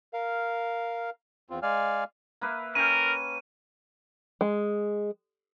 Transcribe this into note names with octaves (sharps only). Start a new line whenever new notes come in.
A#4 F5
E2 C4 F4
G#3 D5 F5 G#5 F6
A#3 B4 E5
C#4 A#4 F5 G5 D#7
G#3